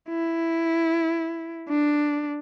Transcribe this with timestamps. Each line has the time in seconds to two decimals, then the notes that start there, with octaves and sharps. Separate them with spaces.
0.09 E4
1.69 D4